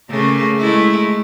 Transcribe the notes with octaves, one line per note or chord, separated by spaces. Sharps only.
C#3 A3 A#3
G#3 A3 E4